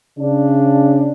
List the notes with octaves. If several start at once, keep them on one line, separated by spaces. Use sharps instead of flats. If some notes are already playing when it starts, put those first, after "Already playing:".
C#3 D4